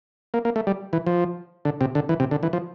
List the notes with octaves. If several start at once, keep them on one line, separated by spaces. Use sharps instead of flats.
A#3
A#3
A3
G3
E3
F3
D3
C3
D3
E3
C3
D3
E3
F3